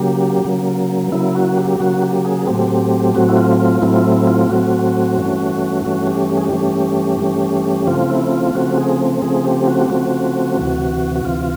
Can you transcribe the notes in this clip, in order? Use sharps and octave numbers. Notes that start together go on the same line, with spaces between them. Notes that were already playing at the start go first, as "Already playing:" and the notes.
Already playing: C#3 F#3 A#3 G4
C#3 F#3 A#3
C#3 F#3 A#3 E4
F#4
G4
C#3 F#3 A#3 F#4
G4
G#4
A2 F#3 A3 C4 G4
A2 F#3 A3 C4 F#4
E4
F4
F4
A2 F#3 A3 C4 E4
F4
E4
F4
A2 F#3 A3 C4 F#4
G2 E3 A3 C#4
G2 E3 A3 C#4 F#4
G4
G4
G#4
G4
G2 E3 A3 C#4
G2 E3 A3 C#4
C#3 F3 A3 C4 F4
E4
F4
C#3 F3 A3 C4 F#4
G#4
C#3 F3 A3 C4 G#4
G4
F#4
G4
C#3 F3 A3 C4 F#4
D2 C3 E3
F#4
D2 C3 E3 F4